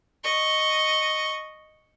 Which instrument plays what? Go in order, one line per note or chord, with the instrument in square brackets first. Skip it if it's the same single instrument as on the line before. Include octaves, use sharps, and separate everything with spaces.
[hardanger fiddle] D#5 C#6